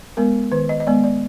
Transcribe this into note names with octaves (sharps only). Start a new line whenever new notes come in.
G#3 B3 A#4
D#3 B4
D#5
D#5
G#3 B3 D5
D5